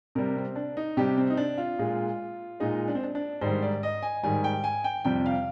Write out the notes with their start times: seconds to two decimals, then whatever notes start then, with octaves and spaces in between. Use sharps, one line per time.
0.15 C3 G3 A#4
0.36 C4
0.56 D4
0.77 D#4
0.97 C3 G3 G4
1.18 C4
1.30 D#4
1.37 D4
1.58 F4
1.79 A#2 G#3
2.60 A#2 G#3 D#4
2.88 D4
2.95 C4
3.03 D4
3.15 D4
3.41 G#2 D#3 G3 C5
3.62 D5
3.83 D#5
4.03 G#5
4.23 G#2 D#3 G3 G#5
4.44 G5
4.64 G#5
4.84 G5
5.05 F2 C3 G3 G5
5.26 F5